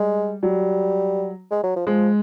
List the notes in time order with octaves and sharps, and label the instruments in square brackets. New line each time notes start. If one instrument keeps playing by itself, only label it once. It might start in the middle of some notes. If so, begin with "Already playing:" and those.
Already playing: [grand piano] G3 [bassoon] G#3
[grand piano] F#3 [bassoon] G3
[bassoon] G#3
F#3
F3
[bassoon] F3 [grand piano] G#3